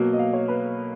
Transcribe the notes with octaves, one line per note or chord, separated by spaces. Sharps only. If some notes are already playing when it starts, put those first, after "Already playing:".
Already playing: B2 F#3 A#3
D#5
F5
C#5
B4